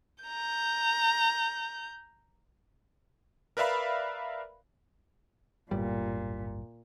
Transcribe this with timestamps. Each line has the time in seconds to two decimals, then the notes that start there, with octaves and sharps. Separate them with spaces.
0.24 A#5 G6
3.57 A#4 B4 D5 E5 F5 B5
5.71 D1 G1 A#2 G3